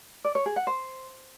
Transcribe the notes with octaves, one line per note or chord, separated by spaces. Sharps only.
D5
C#5
G#4
F#5
C5